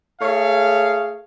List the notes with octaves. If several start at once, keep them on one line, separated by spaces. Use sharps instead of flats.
A3 G#4 C#5 F5